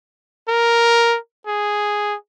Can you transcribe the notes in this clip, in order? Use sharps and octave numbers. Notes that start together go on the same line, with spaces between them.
A#4
G#4